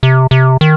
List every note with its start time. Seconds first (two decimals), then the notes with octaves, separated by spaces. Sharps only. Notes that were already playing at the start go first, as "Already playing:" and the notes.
0.03 C3
0.31 C3
0.61 D#3